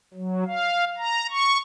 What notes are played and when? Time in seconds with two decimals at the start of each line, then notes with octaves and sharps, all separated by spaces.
0.14 F#3
0.47 F5
0.98 A#5
1.30 C#6